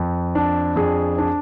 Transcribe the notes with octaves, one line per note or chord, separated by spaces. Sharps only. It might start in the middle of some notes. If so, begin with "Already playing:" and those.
Already playing: F2
D4
F2 G#4
D4